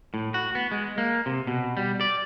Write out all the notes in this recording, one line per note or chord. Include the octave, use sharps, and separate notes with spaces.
A2
F#4
B3
G#3
A#3
C3
B2
G3
D5